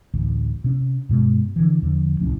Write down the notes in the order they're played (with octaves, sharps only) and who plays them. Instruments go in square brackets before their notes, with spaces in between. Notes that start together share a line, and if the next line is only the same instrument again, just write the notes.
[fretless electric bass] A1 D2
C3 C#4
G2 B2 G#3
D3 E3
E2 D3 F3
D1 C2 A3 C#4